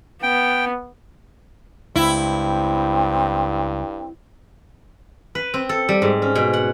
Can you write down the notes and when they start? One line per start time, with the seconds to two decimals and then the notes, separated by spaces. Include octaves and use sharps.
0.23 B3 G5
1.96 C#2 G2 C4 E4
5.35 B4
5.54 C4
5.69 A4
5.89 G3
6.02 G#2
6.22 C#4
6.35 B2
6.53 F#5